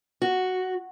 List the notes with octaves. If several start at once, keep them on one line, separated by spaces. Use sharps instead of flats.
F#4